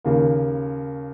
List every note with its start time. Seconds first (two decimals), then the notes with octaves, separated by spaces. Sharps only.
0.05 D#2 C#3 A#3